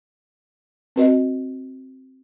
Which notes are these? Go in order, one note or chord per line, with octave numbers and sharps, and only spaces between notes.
C4 F#4 B4 D#5